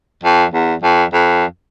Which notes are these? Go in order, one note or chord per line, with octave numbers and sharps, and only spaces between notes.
F2
E2
F2
F2